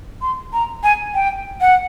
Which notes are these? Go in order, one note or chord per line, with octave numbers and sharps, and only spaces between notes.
C6
A#5
G#5
G5
F#5